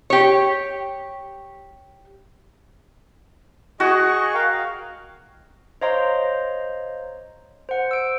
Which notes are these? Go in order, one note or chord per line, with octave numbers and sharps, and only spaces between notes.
G4 C#5
F#4 G#4 D#5 C#6
A#4 F5 G5
F5
C5 C#5 D#5 F5 A#5 C6
C5 F#5
E6 D7